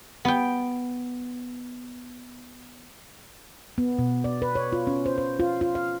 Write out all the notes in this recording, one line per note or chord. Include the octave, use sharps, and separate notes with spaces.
B3 G5
B3
B2
D5
B4
C#5
F4
C#4
C5
C5
F4
F4
F5